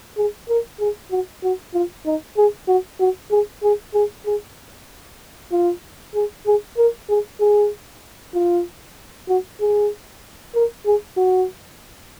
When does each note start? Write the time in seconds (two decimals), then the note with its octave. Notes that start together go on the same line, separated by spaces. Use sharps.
0.17 G#4
0.49 A#4
0.80 G#4
1.11 F#4
1.43 F#4
1.74 F4
2.06 D#4
2.37 G#4
2.68 F#4
3.00 F#4
3.31 G#4
3.63 G#4
3.94 G#4
4.26 G#4
5.52 F4
6.15 G#4
6.46 G#4
6.78 A#4
7.09 G#4
7.40 G#4
8.34 F4
9.28 F#4
9.60 G#4
10.55 A#4
10.86 G#4
11.17 F#4